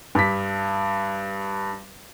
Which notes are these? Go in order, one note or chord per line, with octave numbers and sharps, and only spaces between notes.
G2 B6